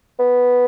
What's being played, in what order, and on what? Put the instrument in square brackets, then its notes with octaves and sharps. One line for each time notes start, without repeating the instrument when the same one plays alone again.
[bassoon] B3